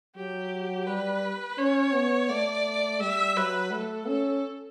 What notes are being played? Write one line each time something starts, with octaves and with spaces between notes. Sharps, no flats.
F#3 G4
G3 B4
C#4 C#5
B3
A3 D5
G3 E5
F#3 B4
A3 A4
C#4 A4